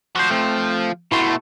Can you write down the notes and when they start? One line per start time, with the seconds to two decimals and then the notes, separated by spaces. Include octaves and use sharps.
0.16 F3 F#4 C5
0.30 A3 C4
1.12 B2 A3 E4 F#4 C6